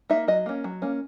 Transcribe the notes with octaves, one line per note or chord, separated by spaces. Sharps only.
A#3 D#4 E5
F#3 D#5
A#3 C#4
F#3
A#3 C#4